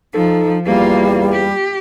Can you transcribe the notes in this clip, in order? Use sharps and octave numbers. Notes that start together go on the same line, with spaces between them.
F3 D#4 A4
E2 G3 A#3 F4
G4